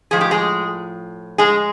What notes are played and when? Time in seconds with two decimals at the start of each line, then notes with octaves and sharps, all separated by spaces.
0.11 A2 F3 G#3 G#4
0.21 G4
0.31 G#3 G#4
1.38 G#3 G#4